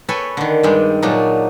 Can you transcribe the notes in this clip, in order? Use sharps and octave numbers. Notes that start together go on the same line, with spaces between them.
A4 B4 C#5 G5 G#5
D3 D#3
G2 G3 G#3
A#2 F#3 D4 D#4